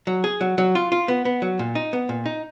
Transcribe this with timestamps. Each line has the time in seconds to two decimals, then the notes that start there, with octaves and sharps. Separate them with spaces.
0.07 F#3
0.24 G#4
0.41 F#3
0.58 F#3
0.75 F4
0.92 F4
1.08 B3
1.25 B3
1.42 F#3
1.59 A#2
1.75 D#4
1.93 B3
2.09 A#2
2.26 D#4